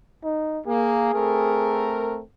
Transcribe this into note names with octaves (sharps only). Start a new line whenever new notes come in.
D#4
A#3 G#4
A3 C4 A#4